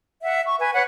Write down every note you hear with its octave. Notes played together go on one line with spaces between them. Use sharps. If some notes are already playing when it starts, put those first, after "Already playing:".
E5 F#5
C#6
B4 G#5
B4 C#5 F#5